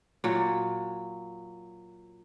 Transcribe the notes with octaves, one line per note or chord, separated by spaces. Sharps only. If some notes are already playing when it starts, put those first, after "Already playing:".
A#2 F#3